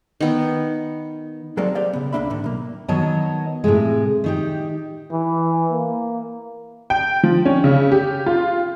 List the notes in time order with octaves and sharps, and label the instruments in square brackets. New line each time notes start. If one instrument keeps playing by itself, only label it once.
[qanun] D#3 B3
[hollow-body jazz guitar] F#3 G#3 A#3 C4 A4 D5
G4 C5 D5 F5
C#3 B3
C#2 B2 A#3 D4 E5 B5
A2 D3 D#3
B1 A#3
[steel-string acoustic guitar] D#3 F#3 B3 C#5 D#5 A5
A2 C3 G#3
D#3 D#4 G4
[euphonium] E3
A#3
[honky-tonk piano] G5
F3
C#4
C#3
G4
F4